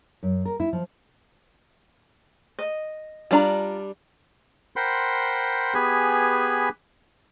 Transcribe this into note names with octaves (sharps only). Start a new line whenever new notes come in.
F#2
A#4
E4
F3
D#5
G3 D4 F4 A#5
A#4 C5 F#5 G5 B5 C6
B3 G4 G#4 B4 G#5 B5